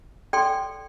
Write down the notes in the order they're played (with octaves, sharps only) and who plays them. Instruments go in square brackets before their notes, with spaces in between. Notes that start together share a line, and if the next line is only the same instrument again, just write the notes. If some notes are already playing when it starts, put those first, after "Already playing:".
[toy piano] A4 D5 G5 C6